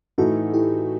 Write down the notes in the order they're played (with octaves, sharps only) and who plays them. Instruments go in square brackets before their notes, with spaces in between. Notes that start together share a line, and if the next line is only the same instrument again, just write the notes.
[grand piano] A2 E3 A3 D#4 [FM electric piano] F#4 A4
[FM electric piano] E4 G4